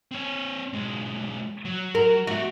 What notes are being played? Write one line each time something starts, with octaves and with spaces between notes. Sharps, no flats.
C4 C#5
B1 G#3
F#3
A#4
G#3 F#4 E5